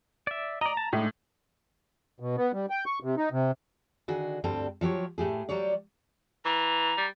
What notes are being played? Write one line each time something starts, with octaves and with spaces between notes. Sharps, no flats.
D5 E5
D5 D#5 A#5
A5
A2 G#3 D4 D#4
B2
B3
G3
G5
C#6
C3
D#4
C3
D3 D#3 F#4 G#4
D2 G2 G3 C4 A4 G5
F3 F#3 G4 C#5
A2 A3 G4 G#4
F#3 G3 G4 C#5 D5
E3 A#5
G3